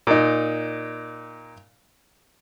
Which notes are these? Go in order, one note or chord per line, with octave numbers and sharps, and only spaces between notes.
A#2 D#4